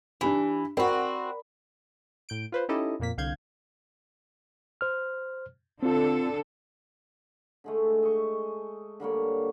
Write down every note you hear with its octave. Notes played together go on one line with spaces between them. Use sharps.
E3 D4 G4 B5
C4 F#4 A#4 D5 B5
A2 G6 D7
F4 B4 C5
C#4 D#4 E4 G4 A4 D#5
F2 A#2 A#3 B6
C2 D3 F5 G6 G#6
C5 F6
D3 C4 D4 F4 A4
D3 G#3 A3
D#5 C#6
D3 G3 A#3 C#5